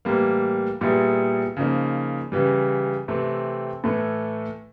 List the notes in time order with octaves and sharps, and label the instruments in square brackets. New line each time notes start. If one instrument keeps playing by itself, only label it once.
[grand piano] A2 E3 G3 A#3
A#2 G3 B3 E4 G#4
C#3 F3 A#3 D#4
C#3 E3 G3
C3 E3 A3 C4
A2 E3 A3